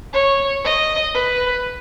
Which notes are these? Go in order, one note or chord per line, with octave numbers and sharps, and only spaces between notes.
C#5
D#5
B4